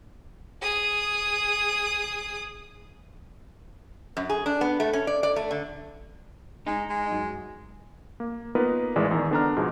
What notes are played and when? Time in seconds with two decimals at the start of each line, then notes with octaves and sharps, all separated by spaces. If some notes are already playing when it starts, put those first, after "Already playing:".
0.62 G#4 D#6
4.17 F#2
4.30 G#4
4.46 D4
4.61 B3
4.80 A3
4.93 C#4
5.07 D5
5.23 D5
5.36 A3
5.51 D3
6.67 G#3 D#4
6.89 G#3
7.12 F#2
8.20 A#3
8.55 A#3 B3 D#4 F4 A#4 B4
8.96 A1 E3 G#3 D5
9.11 E2 D#3
9.31 D3 B3 D4 D5 A#5 F6
9.57 G#2 B2 F3 G#3